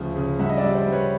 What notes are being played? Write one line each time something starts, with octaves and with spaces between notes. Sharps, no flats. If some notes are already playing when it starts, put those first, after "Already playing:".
Already playing: D2 C#3 F3
C#3
G2 E5 F#5
D#5
D5 E5
G3
C5 D5
G3
B4 C#5